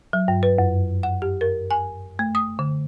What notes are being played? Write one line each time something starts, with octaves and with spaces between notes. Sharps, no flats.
F#3
G2
B4
F#2
F#5
G4
A#4
G#5
A3
D#6
D3